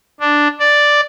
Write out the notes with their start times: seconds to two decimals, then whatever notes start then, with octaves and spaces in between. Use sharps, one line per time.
0.20 D4
0.60 D5